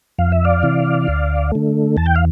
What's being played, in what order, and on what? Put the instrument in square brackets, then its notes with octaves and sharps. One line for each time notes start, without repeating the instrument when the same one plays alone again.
[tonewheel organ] F2 F5
E5
D5 F5
C3 E3
D2
D3 A3
E2 A5
G5
F5